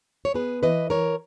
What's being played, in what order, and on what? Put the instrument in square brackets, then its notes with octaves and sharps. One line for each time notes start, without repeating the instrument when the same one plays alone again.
[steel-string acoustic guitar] C#5
B3 G#4 B4
E3 B4 D#5
E3 A#4 C#5